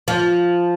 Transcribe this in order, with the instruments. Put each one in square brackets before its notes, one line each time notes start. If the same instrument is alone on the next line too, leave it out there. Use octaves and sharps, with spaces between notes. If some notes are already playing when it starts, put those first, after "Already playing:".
[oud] F3